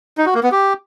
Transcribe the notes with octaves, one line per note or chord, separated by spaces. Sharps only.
D#4
F#4
A#3
B3
G4